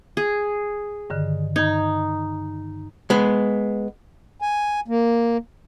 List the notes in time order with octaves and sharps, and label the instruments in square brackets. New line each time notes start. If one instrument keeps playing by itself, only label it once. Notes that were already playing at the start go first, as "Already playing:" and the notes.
[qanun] G#4
[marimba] G2 D3 D#3
[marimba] G2 G#6 [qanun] D#4
[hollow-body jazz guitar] G#3 B3
[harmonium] G#5
A#3